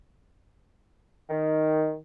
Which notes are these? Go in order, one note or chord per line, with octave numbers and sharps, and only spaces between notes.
D#3